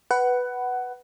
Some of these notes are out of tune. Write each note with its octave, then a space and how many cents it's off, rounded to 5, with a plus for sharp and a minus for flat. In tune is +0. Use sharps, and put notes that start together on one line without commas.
B4 +0 F#5 +15